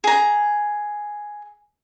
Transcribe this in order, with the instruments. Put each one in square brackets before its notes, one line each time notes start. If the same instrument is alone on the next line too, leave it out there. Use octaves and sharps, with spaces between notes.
[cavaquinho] G#4 A#5